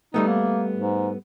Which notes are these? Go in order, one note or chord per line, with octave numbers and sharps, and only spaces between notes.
G3 A3 B3 D#4
A#3
G#2